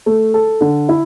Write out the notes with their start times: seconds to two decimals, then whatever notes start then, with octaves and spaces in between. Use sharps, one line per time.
0.06 A3
0.34 A4
0.61 D3
0.89 E4